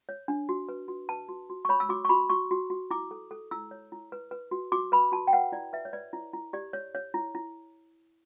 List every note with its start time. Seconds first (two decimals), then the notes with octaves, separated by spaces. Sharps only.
0.09 C#5
0.28 D4
0.49 F#4
0.69 B4
0.88 F#4
1.09 B4 A5
1.29 F#4
1.50 F#4
1.65 C#6
1.69 C#5 B5
1.80 E6
1.89 F#4 D6
2.05 C#6
2.09 F#4 B5
2.30 F#4 C#6
2.51 F#4
2.70 F#4
2.91 E4 D6
3.11 A4
3.31 A4
3.51 E4 E6
3.71 C#5
3.92 E4
4.12 B4
4.31 B4
4.51 F#4
4.72 F#4 D6
4.92 B4 B5
5.12 F#4 A5
5.27 G5
5.33 B4 F#5
5.52 E4 D5
5.73 B4 E5
5.85 C#5
5.93 B4 D5
6.13 E4
6.33 E4
6.53 G4 D5
6.73 C#5
6.95 C#5
7.14 E4
7.35 E4